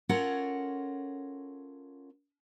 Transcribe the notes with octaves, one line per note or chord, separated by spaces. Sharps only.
C#4 F4 A4 A#4 C#5 F#5